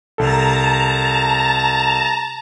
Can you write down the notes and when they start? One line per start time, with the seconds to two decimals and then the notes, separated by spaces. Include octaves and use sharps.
0.18 C2 A4 A5 A#5